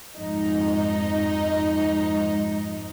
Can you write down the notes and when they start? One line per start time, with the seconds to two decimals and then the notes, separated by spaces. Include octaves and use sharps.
0.17 F2 G#2 D#4